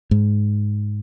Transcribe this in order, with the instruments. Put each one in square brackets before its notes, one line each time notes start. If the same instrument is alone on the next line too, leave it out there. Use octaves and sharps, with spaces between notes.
[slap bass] G#2